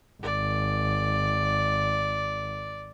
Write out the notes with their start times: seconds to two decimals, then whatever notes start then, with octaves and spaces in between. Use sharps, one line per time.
0.23 G#1 D5